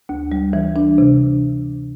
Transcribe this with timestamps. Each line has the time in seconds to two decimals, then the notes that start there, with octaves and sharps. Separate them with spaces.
0.09 D2
0.32 G3
0.53 E3
0.76 D4
0.98 C3